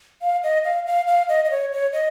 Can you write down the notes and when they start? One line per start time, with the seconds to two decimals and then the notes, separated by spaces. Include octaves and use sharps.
0.22 F5
0.43 D#5
0.64 F5
0.86 F5
1.08 F5
1.29 D#5
1.45 D#5
1.51 C#5
1.72 C#5
1.93 D#5